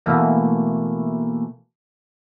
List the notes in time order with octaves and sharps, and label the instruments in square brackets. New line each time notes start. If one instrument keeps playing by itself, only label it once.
[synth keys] B2 E3 A3 A#3